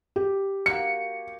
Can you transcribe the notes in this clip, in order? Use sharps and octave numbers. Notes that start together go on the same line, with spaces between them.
G4
A#3 F#4 C#7